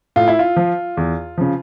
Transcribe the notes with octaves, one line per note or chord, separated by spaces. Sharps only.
A2 F4
E4
F4
F3
E2
C#3 F3